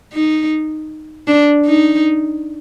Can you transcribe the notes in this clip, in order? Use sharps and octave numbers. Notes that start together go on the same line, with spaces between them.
D#4
D4
D#4